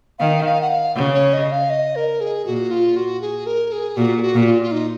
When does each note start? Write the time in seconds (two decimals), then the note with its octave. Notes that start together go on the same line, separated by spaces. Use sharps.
0.19 D#3 F5
0.45 F5
0.61 F#5
0.70 F5
0.95 C#3
1.14 C#5
1.33 D#5
1.51 F5
1.70 D#5
1.96 A#4
2.21 G#4
2.46 A#2 F#4
2.71 F4
2.96 F#4
3.21 G#4
3.46 A#4
3.72 G#4
3.97 A#2 F#4
4.17 G#4
4.22 F#4
4.34 A#2
4.41 F#4
4.46 F4
4.62 F4
4.72 D#4